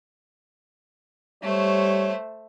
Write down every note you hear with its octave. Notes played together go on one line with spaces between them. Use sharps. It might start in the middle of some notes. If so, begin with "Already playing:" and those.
G3 A3 C5 C#5